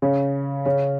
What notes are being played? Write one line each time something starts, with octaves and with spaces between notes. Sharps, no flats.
C#3 C#4
C#3 C#4